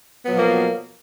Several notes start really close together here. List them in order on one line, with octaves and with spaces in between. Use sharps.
B3 F#3 B2 F3 A#3